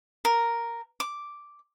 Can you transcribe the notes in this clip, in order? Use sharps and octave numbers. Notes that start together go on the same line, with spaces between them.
A#4
D6